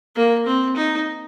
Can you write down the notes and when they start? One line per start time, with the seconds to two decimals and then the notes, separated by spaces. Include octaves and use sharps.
0.16 A#3
0.46 C4
0.76 D#4